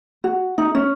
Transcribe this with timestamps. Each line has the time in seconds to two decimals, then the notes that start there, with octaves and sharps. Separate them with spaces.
0.24 F#4
0.58 D#4
0.75 C#4